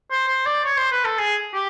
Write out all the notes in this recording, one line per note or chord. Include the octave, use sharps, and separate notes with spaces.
C5
C5
D5
C#5
C5
B4
A4
G#4
G4